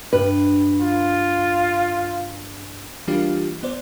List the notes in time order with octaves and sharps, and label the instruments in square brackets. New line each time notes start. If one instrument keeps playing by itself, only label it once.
[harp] G2 [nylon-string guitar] B4
[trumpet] F4
[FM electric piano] E3 G3 A#3 D4 F4 G4
B3 C5 D5